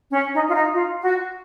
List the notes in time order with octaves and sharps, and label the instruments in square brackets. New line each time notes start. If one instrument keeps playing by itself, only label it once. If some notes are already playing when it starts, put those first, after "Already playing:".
[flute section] C#4
D#4
F4
D#4
F4
F#4